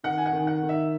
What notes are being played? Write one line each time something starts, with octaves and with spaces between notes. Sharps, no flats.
D#3 F#5
G#5
F#5
D#3
F#5
D#3
E5